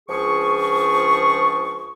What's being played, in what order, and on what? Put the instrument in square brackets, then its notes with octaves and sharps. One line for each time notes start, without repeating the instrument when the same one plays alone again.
[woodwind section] C#2 F3 D4 G#4 C#6